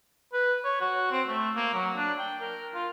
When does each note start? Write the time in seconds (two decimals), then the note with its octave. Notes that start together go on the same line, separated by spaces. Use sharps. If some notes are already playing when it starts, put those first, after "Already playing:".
0.33 B4
0.64 C#5
0.81 F#4
1.11 C4
1.27 A3
1.55 A#3
1.73 F#3
1.96 D4
2.18 G5
2.40 A#4
2.74 F4